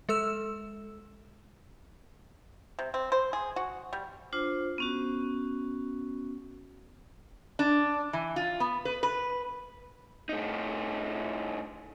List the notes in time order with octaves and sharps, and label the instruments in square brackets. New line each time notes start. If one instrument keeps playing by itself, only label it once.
[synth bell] G#3 A4 E6 E7
[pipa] C3
C4
C5
G#4
F#4
G3
[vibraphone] D4 F4 C5
B3 C#4 F#4
[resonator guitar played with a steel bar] D4
E3
F4
B3
B4
B4
[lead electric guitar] A2 D#4